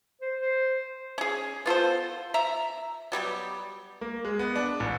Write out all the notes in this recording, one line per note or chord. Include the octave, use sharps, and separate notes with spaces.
C5
C5
C#4 G#4
B3 F4 A4 C5
E5 A#5
F#3 G3 B3 G4
A#3
G#3
B3
D4
A1